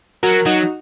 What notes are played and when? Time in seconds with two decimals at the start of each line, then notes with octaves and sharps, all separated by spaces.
0.23 F#3 F#4 A#4
0.46 F#3 D#4 F#4